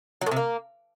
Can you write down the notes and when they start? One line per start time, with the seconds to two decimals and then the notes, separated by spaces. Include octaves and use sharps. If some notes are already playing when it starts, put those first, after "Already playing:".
0.21 F#3
0.26 A2
0.31 C3
0.36 A#3